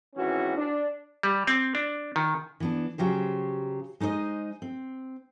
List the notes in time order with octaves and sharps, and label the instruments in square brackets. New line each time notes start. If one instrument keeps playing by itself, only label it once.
[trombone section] G#1 E3 C#4 F#4
D4
[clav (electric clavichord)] G3
C4
D4
D#3
[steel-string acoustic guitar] E3 B3 D4
C#3 F#3 G4 C5
G#3 D#4 C5 C#5 D#5
C4